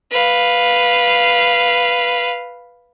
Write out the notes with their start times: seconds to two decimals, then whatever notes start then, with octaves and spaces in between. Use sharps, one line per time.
0.12 B4 F5